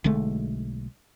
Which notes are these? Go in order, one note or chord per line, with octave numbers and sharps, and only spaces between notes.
B1 D3 G#3 A3